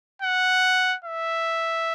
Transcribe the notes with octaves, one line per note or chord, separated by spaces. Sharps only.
F#5
E5